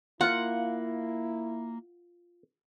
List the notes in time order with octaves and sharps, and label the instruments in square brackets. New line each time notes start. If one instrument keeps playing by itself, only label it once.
[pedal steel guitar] A#3 [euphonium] E4 [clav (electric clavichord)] F4 [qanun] F#5